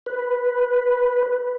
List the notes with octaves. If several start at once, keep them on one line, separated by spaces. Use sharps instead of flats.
B4